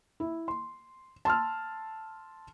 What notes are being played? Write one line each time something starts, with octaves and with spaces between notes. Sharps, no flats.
E4
C6
A5 C6 E6 F6